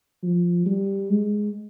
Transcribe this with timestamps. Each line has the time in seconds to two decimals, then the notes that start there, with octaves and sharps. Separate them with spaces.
0.23 F3
0.66 G3
1.10 G#3